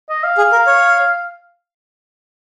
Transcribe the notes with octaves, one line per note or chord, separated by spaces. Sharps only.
D#5
F5
G#4
A#4
C#5